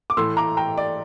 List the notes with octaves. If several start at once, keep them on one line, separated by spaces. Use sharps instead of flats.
D6
A2 E3 A3 C6 E6
A#5 D6
G5 A#5
D5